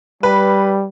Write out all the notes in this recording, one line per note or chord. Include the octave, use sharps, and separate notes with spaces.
G3 B4